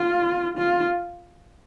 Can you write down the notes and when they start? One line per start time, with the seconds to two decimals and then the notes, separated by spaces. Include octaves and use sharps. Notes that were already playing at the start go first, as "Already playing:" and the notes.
Already playing: F4
0.57 F4